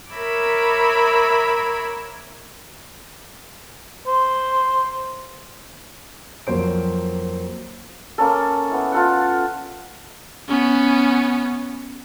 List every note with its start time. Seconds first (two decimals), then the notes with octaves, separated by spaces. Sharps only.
0.12 A#4 C#5 E5 B5 D6
4.07 C5
6.47 F2 F#3 A#3 C5 D7
8.18 A#3 C#4 A4
8.71 B3 E4
8.92 F4 A4 F#5
10.48 B3 C#4